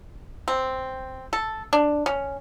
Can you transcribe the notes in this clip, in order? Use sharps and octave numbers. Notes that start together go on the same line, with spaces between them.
C4
A4
D4
C#4